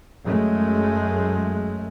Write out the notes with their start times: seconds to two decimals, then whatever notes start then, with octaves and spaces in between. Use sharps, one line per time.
0.24 F#2 G#3 A3